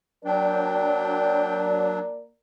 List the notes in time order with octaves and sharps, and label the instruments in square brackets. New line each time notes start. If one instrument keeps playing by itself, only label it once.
[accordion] F#3 D4 [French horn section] A#3 A#4 D5 [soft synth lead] G5